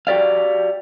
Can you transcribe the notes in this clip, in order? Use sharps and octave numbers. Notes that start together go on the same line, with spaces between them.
F#4 G4 A#4 D5 F5